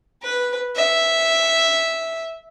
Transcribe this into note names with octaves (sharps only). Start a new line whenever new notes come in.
B4
E5